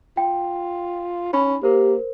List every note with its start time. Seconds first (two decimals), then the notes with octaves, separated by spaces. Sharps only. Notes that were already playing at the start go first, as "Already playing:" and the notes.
0.17 F4 G5
1.33 C#4 D#4 B5
1.63 A#3 G4 A#4 C5